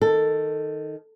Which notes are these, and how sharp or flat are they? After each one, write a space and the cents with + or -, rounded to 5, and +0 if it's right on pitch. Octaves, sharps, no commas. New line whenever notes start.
D#3 +0 A4 +10